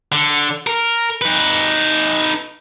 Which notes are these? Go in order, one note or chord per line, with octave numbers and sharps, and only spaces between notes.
D3
A#4
D#4 B4